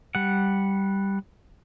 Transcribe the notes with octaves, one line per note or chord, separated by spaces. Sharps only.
G3 F#5